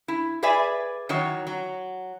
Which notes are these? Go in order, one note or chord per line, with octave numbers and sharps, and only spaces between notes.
E4
G#4 B4 D5 E5 G#5
D#3 E3 F#3 C#5
F#3